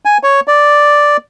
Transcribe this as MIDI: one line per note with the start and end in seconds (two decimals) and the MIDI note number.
0.05 0.18 80
0.23 0.40 73
0.47 1.17 74